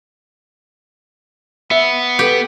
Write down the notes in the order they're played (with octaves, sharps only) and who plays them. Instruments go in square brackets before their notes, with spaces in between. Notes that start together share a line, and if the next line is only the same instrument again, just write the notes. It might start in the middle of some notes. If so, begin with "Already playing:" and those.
[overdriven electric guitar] B3 [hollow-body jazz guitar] E5
[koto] G4 [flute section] A4 B4 G5